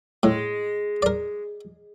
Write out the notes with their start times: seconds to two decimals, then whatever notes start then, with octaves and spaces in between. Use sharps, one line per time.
0.23 A2 G#3
1.02 A#4 D5